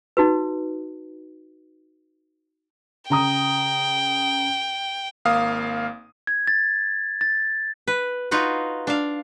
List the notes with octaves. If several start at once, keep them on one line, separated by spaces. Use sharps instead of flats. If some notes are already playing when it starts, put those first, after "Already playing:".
D#4 F#4 B4
C#3 G5 A#5 D#6
G#1 A#3 F5 D#6
G#6
A6
A6
B4
D#4 F4 F#4 B4
D4 F5